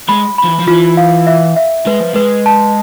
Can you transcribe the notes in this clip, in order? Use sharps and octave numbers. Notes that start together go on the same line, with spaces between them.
G#3 B5
B5
F3
E3
F3
E3 F4
F5
E5
E5
G#3 B4
F3
G#3 B4
A5